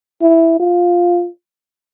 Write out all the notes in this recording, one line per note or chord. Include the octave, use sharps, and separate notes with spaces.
E4
F4